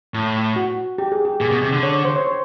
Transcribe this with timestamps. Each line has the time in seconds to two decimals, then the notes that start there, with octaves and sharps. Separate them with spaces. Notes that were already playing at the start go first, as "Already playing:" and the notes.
0.14 A2
0.56 F#4
0.98 G4
1.12 G#4
1.25 G4
1.41 A#2 G#4
1.51 B2
1.62 C3
1.73 D3
1.83 C#5
2.05 C5
2.16 C#5
2.27 C5